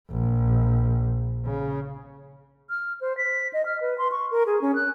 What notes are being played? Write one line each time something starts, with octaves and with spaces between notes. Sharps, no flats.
A#1
C#3
F6
C5
B6
D#5
F6
B4
C6
C#6
A#4
G#4
C#4
F#6